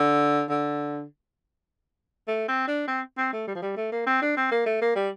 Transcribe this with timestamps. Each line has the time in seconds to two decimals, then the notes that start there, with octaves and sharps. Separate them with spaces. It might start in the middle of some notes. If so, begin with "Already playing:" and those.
Already playing: D3
0.50 D3
2.28 A3
2.48 C4
2.68 D4
2.88 C4
3.18 C4
3.33 A3
3.48 G3
3.55 F3
3.62 G3
3.77 A3
3.92 A#3
4.07 C4
4.22 D4
4.37 C4
4.52 A#3
4.66 A3
4.82 A#3
4.96 G3